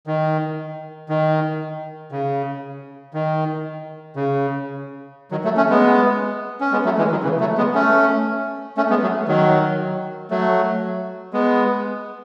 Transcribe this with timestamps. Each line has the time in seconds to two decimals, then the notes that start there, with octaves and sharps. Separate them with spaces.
0.07 D#3
1.09 D#3
2.12 C#3
3.14 D#3
4.16 C#3
5.31 D#3 F#3
5.44 F#3 A3
5.57 A3 C#4
5.70 G#3 B3
6.61 C#4
6.72 G#3 B3
6.85 F#3 A3
6.98 E3 G#3
7.11 D#3 F#3
7.23 C#3 E3
7.40 F#3 A3
7.57 G#3 B3
7.75 A3 C#4
8.77 A3 C#4
8.90 G#3 B3
9.02 F#3 A3
9.28 D#3 F#3
10.31 F#3 A3
11.33 G#3 B3